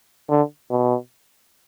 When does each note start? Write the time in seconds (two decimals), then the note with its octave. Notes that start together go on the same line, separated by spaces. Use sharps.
0.29 D3
0.70 B2